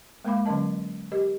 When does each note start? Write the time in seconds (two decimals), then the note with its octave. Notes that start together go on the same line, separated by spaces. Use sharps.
0.24 G#3 A#3 A#4 F5 B5 D6
0.46 D3 F#3 C#4 A#4 D#5 A5
1.12 G4 A#4 D#5